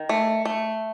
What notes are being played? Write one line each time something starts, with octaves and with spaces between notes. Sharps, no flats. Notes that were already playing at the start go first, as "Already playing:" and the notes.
Already playing: D#3
A3
A3